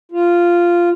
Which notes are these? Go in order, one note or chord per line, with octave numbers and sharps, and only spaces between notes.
F4